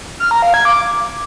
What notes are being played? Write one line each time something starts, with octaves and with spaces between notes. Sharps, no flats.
F6
A#5
F5
G#6
D6